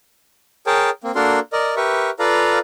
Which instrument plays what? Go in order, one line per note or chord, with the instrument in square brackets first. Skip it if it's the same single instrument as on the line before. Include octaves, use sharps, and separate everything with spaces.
[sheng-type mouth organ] G#4 A#4 C#5 G5 A5
A#3 C4
A#3 D4 F#4 A4 A#4 C6
A#4 D5 D#5
G4 A#4 B4 E5 C#6
F4 A4 B4 D5 F5 A#5